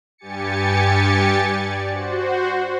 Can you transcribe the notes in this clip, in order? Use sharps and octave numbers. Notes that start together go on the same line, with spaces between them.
G2 G4 G#5 A6 C#7
D5
F#4 C5